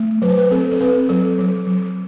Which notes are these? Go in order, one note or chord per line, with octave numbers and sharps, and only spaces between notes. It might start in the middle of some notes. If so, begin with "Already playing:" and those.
Already playing: A3
F#3 B4
C5
B4
C4 A4
A4
C4 B4
F#3 A4
F#3
F#3